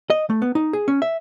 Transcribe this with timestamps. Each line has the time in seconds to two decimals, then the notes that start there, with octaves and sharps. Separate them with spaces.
0.10 D#5
0.30 A3
0.42 B3
0.55 D#4
0.73 G#4
0.88 C#4
1.02 E5